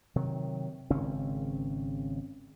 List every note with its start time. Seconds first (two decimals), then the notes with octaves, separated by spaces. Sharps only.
0.16 C3 D#3 F#3
0.90 G#1 C#3 C4 C#4